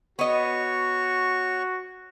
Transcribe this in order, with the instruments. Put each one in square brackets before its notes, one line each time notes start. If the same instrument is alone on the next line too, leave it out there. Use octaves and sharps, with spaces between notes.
[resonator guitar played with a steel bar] B3 D#5 [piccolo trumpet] F#4 [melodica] C#5 C#6